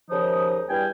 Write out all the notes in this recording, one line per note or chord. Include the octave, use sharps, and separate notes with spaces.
D#2 C#3 F3 D#4 D#6
E2 G2 G3 G5 G#5